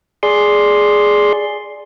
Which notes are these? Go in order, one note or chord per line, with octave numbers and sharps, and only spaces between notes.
G#4 D5 C6